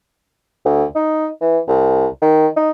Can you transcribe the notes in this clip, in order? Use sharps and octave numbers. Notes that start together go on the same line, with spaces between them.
D2
D#4
E3
C2
D#3
D#4